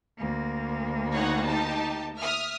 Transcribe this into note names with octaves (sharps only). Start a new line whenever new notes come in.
D2 A#3
D#4 C#5 F#5
D#4 G4 A5
E5 D#6 F6